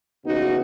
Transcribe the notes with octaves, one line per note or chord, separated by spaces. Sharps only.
D#2 C#3 E3 B3 D#4 F#4